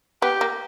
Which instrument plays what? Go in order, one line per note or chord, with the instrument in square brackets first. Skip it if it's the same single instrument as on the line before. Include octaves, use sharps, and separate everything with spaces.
[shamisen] B3 [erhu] G4
[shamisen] A#3